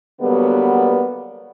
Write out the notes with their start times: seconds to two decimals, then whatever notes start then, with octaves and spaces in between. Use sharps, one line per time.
0.21 D3 F#3 G3 A#3 B3